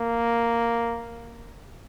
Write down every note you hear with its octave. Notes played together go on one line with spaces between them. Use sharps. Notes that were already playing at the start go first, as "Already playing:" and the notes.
Already playing: A#3